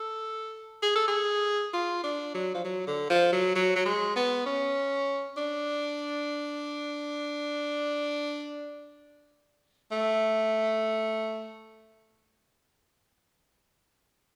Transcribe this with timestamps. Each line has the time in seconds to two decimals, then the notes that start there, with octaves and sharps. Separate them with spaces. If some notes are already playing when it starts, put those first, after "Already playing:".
Already playing: A4
0.83 G#4
0.96 A4
1.08 G#4
1.73 F4
2.04 D4
2.34 F#3
2.55 F3
2.65 F#3
2.87 D3
3.10 F3
3.32 F#3
3.55 F#3
3.76 F#3
3.86 G#3
4.16 B3
4.46 C#4
5.37 D4
9.92 A3